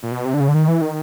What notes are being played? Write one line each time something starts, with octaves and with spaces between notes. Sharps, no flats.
A#2
B2
C3
D3
C#3
D3
D#3
E3
D#3